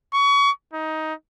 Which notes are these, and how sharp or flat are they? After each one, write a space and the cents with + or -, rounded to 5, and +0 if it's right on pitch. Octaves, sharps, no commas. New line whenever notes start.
C#6 +25
D#4 +15